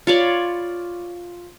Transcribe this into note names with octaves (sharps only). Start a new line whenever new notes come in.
F4 C#5 D5 B5